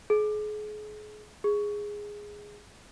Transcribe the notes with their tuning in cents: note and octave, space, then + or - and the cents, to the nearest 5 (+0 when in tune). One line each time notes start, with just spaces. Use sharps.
G#4 +35
G#4 -5